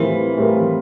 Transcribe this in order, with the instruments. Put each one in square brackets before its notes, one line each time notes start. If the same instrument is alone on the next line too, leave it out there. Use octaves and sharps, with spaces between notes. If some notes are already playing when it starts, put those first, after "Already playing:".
Already playing: [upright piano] A2 G3 C4 F4 A#4 [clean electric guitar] E3
[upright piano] A2 G3 C4 F4 A#4